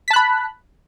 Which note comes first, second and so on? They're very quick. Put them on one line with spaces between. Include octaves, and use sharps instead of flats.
B6 A5 F#6 B5